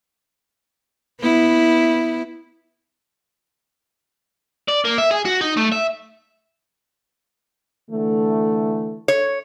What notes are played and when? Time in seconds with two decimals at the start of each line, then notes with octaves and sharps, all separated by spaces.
1.21 B3 E4
4.69 D5
4.85 A#3
4.98 E5
5.11 G#4
5.25 F#4
5.41 D#4
5.57 A3
5.72 E5
7.90 D3 E3 A3
9.08 C#5